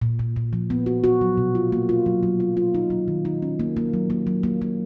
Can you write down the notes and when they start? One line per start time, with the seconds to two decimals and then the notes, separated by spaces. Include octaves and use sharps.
0.02 A#2
0.19 A#2
0.36 A#2
0.53 F3
0.70 B3
0.86 F#4
1.04 F#4
1.21 F#3
1.37 B2
1.55 F4
1.72 A#3
1.89 F4
2.06 F#3
2.23 F#3
2.40 F4
2.57 F4
2.75 D#4
2.90 F#3
3.08 D#3
3.25 D#4
3.42 C#4
3.59 A#3
3.77 A#3
3.94 F#3
4.10 A#3
4.27 F#3
4.43 A#3
4.62 A#3